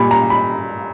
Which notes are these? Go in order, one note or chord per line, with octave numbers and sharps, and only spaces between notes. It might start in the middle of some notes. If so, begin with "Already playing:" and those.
Already playing: A#2 G3 B5
A#5
B5